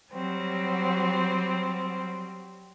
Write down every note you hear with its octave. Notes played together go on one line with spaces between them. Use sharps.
F#3 G3 C4